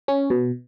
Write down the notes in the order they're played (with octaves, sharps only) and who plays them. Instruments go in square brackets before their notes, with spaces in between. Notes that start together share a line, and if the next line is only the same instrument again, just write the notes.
[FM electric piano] C#4
B2